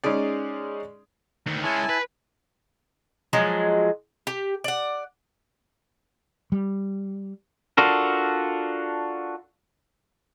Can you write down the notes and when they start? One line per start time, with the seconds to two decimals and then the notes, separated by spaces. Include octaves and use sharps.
0.04 G#3 C#4 D#4 G#4 D5
1.46 D2 D#3
1.64 G#3 C#4 E4 G#5 A5
1.89 B4
3.33 F3 F#3 G#3
4.27 G4
4.64 D5 F#5
6.52 G3
7.77 D4 F4 F#4 A4 A#4